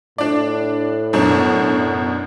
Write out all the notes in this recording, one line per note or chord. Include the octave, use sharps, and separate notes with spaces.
A2 D4 D5
F#2 B2 D4